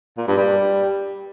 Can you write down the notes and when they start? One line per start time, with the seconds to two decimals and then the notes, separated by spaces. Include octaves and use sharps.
0.17 A#2
0.27 G2
0.37 G3